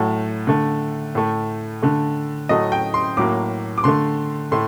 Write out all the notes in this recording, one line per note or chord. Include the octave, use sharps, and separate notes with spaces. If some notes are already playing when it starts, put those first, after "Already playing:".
Already playing: A2 F#3 A3 F#5
D3 A3
A2 A3
D3 A3
A2 F#3 A3 D#5
G5
C6
A2 F#3 A#3 D6
D6
D3 A3 C6
A2 A3 C6